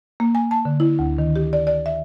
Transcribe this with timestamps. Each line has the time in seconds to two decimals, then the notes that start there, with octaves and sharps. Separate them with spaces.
0.20 A#3
0.35 G#5
0.51 A5
0.65 D3
0.80 E4
0.99 D2
1.18 D#3
1.36 G4
1.53 D5
1.67 D5
1.86 E5